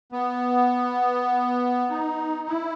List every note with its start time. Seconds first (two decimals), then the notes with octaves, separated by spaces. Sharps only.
0.12 B3
1.90 D#4
2.49 E4